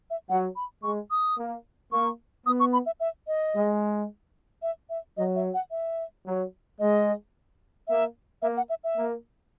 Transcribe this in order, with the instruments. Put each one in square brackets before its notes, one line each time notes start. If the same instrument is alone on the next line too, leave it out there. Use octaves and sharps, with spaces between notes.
[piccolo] E5
[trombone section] F#3 [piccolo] F#5
[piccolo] B5
[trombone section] G#3 [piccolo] C#6
[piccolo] D#6
[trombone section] A#3
[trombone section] A#3 [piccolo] C#6
[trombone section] B3 [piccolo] D#6
[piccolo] C#6
B5
E5
E5
D#5
[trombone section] G#3
[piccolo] E5
E5
[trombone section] F#3 [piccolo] D#5
[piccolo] E5
F#5
E5
[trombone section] F#3
[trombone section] G#3 [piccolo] D#5
[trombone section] A#3 [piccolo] E5
[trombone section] A#3 [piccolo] E5
[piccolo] F#5
E5
E5
[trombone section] A#3